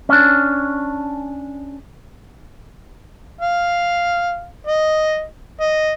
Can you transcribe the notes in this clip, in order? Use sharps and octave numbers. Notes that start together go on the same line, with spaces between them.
C#4 D4
F5
D#5
D#5